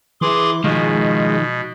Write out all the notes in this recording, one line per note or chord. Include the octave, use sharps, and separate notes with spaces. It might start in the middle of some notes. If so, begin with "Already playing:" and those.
E3 G#4 C6 D6
B2 D#3 F3 G#3